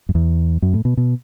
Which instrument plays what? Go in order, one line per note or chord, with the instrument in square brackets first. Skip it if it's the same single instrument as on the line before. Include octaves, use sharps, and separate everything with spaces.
[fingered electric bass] F#2
E2
F#2
A2
B2
B2